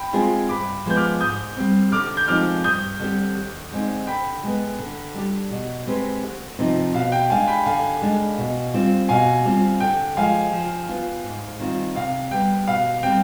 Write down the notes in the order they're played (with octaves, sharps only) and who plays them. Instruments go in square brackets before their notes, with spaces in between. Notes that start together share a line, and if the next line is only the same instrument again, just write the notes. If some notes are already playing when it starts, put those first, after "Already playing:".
Already playing: [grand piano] G5 B5
[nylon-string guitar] G#3 C4 F4 G#4
[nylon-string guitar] G2 [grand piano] B5 D6
[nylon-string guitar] F3 G#3 B3 [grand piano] G6
[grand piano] D6 F6
[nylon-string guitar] G#2 [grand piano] D#6 G6
[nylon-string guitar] G3 C4
[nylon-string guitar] D3 [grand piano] D6 F6
[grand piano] G6
[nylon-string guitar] F3 G#3 C4 D#4 [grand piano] D6 F6
[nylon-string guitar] G2 [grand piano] D#6 G6
[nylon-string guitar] D3 G3 C4 G4
D#2
D3 G#3 C4 D#4
[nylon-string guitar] D3 [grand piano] G5 B5
[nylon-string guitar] G#3 B3
D3
G3 D4 G4
B2
G#3 C4 G4 B4
D2
C3 F3 C4 D#4
[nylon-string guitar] B2 [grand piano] F5
[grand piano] G5
[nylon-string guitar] G#3 D4 [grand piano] F5 G#5
[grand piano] G5 B5
[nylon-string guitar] D3 [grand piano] F5 G#5
[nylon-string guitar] G#3 D4
B2
G3 C4 F4
[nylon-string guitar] B2 [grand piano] F5 G#5
[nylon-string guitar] G3 C4 F4
[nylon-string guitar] D3 [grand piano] G5
[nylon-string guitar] F3 G#3 [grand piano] F5 G#5
[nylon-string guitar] F3
B3 F4
G#2
D#3 G3 C4 F4
[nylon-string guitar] C3 [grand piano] F5
[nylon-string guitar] G3 B3 [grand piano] G5
[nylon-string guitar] B2 [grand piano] F5
[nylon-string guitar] G3 C4 [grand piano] G5